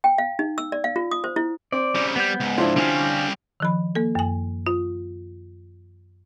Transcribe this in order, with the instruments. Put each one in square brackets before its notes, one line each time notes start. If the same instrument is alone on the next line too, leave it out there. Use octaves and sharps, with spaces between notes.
[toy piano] G5
F5
D#4
E6
D5
F5
F4
D#6
C5
E4
[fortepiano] C4 [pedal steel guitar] D5
[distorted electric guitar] C#3 G3
[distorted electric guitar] G3 [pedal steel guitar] B3 G6
[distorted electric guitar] C#2 G#2
[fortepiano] F3 D4 E4
[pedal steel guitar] D3 C#4 F5 [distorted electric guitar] G3 C4
[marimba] D#3 F3 B5
A#3 A4
F#2 G#5
F4